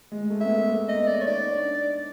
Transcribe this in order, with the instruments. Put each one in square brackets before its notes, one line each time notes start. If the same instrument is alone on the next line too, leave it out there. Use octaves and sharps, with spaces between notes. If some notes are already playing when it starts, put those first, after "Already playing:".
[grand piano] G#3
A3
[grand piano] B3 [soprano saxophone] E5
[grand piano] A#3
A#3
[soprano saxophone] D#5
[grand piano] B3
[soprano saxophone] D5
C#5
[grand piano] D#4 [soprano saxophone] D5
[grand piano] D4